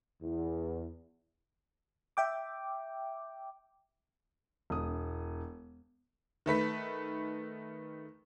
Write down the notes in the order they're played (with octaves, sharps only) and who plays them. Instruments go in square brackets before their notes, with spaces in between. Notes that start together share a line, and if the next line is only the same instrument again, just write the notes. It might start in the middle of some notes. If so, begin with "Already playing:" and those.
[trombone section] E2
[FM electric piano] E5 G5 D6
[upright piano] E1 D#6
[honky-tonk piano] D#3 A3 B4 B6